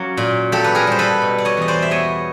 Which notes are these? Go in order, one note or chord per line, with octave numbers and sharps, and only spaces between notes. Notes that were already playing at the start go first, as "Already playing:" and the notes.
Already playing: F#3 A#3 C#4
A#2
A#3 G4 A4
B4
G#4 A#4
G3 C5
A4 B4
B2
D5
C#5 D#5
E2 D#5
C5 D5
E5
B3 C#5 D#5